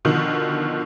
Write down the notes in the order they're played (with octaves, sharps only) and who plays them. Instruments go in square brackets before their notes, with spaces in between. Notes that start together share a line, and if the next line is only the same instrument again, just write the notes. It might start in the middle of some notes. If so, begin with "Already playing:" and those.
[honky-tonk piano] B2 D3 D#3 F3